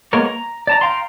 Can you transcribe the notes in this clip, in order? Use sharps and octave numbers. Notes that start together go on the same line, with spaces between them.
G#3 A#3 B3 A#4 C#5
A#5
D5 A5 A#5
F5 G5 A#5 C6